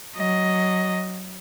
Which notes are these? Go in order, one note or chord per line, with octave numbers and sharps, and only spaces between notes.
F#3 D#5